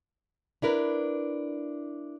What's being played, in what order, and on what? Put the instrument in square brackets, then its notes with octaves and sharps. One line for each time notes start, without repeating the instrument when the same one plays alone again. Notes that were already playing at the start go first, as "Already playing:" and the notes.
[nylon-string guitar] D4 E4 A#4 B4